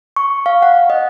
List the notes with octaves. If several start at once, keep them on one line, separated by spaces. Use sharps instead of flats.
C#6
F5
F#5
D#5